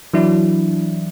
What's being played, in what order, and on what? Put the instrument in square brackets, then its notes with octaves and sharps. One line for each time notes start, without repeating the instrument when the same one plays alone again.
[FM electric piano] E3 F#3 D4 E4